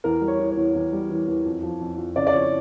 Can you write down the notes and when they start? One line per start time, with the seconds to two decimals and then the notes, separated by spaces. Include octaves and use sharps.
0.04 E2 A#4
0.21 G3
0.28 C#5
0.39 E3
0.51 C#5
0.57 E2
0.75 E2
0.93 G3
1.10 E3
1.27 E2
1.45 F2
1.63 F3
1.80 F2
1.98 F2
2.16 C#3 D5
2.27 D5
2.34 F2 C#5